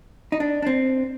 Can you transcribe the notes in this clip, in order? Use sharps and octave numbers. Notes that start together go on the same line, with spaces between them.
D#4
D4
D4
C4